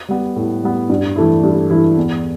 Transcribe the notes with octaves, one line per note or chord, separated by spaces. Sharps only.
G3 B3
A2
G3 B3
G2
E3 A3 E4
G2
E3 A3 E4
E2